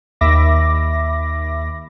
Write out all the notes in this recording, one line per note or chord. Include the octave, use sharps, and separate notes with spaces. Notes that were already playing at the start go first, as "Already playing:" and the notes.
D#2 E5 B5 D6 A#6